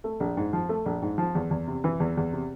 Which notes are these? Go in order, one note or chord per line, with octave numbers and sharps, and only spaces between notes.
A3
A#1
G#2
F3
A3
A#1
G#2
F3
E2
E2
C3
E3
E2
E2
C3